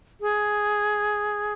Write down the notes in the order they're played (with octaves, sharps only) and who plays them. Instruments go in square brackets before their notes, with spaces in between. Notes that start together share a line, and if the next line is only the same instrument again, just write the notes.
[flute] G#4